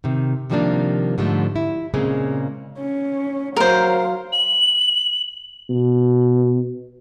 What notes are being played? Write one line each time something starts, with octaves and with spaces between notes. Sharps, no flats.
C3 D#3
C3 D#3 F3 G3 A#3 D4
G#2 D3 F3 G3 A3
E4
A#2 C#3 G#3 A#3 C4
C#4
F#3 A#4 C5 F5
F#7
B2